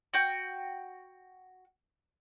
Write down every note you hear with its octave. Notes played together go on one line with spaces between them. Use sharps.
F#4 G5